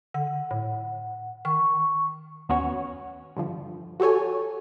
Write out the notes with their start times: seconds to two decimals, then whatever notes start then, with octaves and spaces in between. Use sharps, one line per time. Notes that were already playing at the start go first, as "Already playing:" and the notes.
0.14 D3 F#5
0.51 A2
1.45 D#3 C#6
2.49 D#2 B3 C#4 F#4 C#5
3.36 G2 D3 F3
4.00 F#4 G4 A4 C#5 G#5